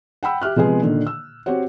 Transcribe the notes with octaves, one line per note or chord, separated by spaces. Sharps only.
F#5 G5 B5 E6
G4 E5 F6 F#6
C3 F3 G#3 B3 G#4
A#2 D3 D#3
E6
C4 F#4 G4 C#5 F#5